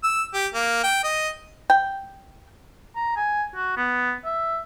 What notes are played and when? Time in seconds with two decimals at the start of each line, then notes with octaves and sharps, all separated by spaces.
0.03 E6
0.34 G4
0.54 A#3
0.84 G5
1.04 D#5
1.70 G5
2.96 A#5
3.16 G#5
3.56 F#4
3.77 B3
4.25 E5